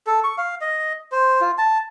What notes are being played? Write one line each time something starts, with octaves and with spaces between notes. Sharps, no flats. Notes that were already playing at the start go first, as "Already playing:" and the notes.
A4
C#6
F5
D#5
C5
F4
A5